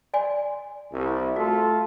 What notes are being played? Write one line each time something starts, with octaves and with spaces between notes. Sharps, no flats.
D5 G#5 C6
C2
A3 F4 F#4 A4